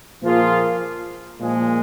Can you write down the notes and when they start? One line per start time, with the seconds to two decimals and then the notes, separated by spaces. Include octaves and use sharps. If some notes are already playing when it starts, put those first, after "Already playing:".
0.23 A#2 F3 A#3 F4 G#4
1.40 A#2 F3 G#3